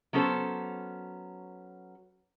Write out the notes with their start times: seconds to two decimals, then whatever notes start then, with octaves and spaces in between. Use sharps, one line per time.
0.13 F#3 B3 C#4 A4 C5